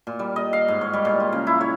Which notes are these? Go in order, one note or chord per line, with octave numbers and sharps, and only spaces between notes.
A#2
G3
D#5
F5
G#2
C#5
G3
A#2
F4
C#3
E4
C#5